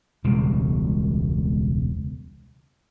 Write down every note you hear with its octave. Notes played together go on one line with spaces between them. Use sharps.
E1 C#2 B2 G3